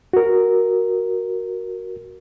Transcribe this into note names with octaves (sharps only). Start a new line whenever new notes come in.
F#4 A#4